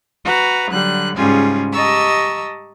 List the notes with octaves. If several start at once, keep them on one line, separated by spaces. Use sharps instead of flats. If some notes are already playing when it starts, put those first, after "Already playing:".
F#4 B4 A#5
D3 F#3 G3 F#6
G#2 C#3 G3 C#4 F4 G#4
G4 D#5 A5 A#5 C#6 E6